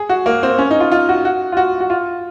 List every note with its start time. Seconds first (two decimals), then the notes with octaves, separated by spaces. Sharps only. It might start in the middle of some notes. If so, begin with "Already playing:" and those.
Already playing: G#4
0.09 F#4
0.26 A#3
0.43 C4
0.59 C#4
0.71 D#4
0.80 F4
0.92 F4
1.09 F#4
1.25 F#4
1.52 F4
1.57 F#4
1.80 F#4
1.90 F4